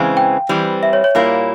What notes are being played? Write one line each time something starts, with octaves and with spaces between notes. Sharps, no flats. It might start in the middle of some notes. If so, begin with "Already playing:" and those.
Already playing: C#3 E3 G#3 C4 F5
G5
E3 G3 C4
E5
C#5
C#5
A#2 G3 A#3 E4